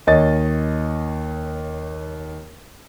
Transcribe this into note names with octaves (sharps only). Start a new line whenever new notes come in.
D#2 C#5 D#5 A6